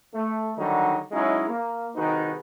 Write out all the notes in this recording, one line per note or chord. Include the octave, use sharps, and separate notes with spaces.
A3
D3 D#3 F#3 G3 D#4
F#3 G#3 C#4 D#4 E4
A#3
C2 D#3 D#4 F#4 G#4 B4